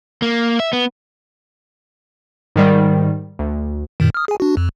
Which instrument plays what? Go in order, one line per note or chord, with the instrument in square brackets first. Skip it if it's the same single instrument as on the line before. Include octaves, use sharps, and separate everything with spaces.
[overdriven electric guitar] A#3
E5
B3
[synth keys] G#2 D#3 G3
D2
[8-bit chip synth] F#2 A#2 D#3
D#6 F6
G#4 G#5
D4 F#4
F2